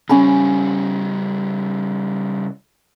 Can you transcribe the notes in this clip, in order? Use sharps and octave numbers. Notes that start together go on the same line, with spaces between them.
C#3 G3 C#4 G#5 B5